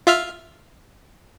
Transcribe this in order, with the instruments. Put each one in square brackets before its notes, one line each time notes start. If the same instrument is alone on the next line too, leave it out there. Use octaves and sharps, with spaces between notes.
[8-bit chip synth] F4 E5 F6